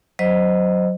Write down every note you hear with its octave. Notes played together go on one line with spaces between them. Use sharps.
F#3 C5 D#5